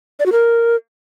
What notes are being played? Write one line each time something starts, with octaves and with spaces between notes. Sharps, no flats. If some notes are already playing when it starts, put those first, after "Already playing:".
D5
F#4
A#4